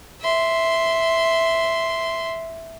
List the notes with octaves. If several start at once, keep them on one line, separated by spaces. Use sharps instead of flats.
E5 C6